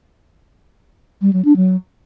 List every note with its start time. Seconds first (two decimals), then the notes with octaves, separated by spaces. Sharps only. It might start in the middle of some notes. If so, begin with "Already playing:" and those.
1.22 G3
1.33 F#3
1.45 D4
1.56 F#3